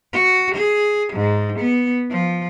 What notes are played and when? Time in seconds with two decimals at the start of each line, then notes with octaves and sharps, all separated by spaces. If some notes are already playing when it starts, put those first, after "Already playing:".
0.13 F#4
0.55 G#4
1.13 G#2
1.59 B3
2.11 F3